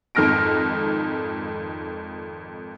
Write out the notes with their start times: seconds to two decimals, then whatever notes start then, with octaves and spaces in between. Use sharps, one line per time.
0.15 G#1 F2 D#4 F6 A#6 D7